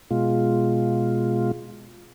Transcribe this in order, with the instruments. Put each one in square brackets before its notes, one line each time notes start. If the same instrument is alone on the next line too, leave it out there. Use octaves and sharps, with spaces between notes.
[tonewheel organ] B2 G#3 F4